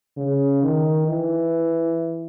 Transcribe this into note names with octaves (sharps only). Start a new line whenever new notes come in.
C#3
D#3
E3